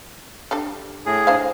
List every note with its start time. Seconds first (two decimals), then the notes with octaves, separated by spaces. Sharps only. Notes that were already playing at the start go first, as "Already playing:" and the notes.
0.51 D4 G4 A4
1.06 A2 G#4
1.27 D4 C5 F5